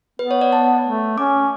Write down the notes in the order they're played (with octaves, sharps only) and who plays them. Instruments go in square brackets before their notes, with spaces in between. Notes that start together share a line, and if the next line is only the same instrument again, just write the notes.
[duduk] B3 [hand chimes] B4
[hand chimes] C#5
D5
A5
[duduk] A3
[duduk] C#4 [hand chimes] D6